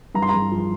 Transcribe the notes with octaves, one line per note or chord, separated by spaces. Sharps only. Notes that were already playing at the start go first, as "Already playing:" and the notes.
G2 A#5
C6
G2 A#5
F3